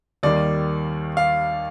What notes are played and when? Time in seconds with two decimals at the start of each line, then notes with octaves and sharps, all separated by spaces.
0.23 D#2 D#3 G3 A#3 D5
1.17 F5